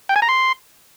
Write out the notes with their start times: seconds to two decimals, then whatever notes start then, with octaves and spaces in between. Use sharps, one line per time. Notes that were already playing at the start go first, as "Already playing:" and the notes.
0.09 G5
0.16 G#5
0.22 A#5
0.29 C6